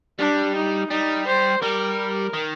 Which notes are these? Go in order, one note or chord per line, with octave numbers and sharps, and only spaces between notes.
G3 D4
D#4
G3 D#4
C5
G3 A#4
D#3